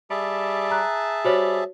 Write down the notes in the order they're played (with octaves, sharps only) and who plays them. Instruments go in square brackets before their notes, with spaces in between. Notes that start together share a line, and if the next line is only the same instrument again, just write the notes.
[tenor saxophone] G3 [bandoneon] G#4 E5 A5
[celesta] A#5 F#6
[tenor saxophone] G3 [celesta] F#4 C5 C#5